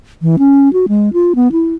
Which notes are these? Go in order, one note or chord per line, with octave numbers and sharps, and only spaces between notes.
E3
C#4
F#4
G#3
F4
B3
E4